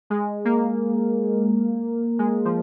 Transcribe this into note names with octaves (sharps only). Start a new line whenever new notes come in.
G#3
A#3
G#3
F3